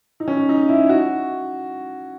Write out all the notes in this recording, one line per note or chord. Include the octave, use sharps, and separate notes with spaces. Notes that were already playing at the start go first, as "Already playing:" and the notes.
D#4
C#4
D#4
E4
F#4